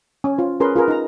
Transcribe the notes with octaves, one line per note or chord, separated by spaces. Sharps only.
C#4 G#5
F4 C5
C#4 G#4 A#4 B4 C6
F4 G#4 A#4 B4
D#4 A#5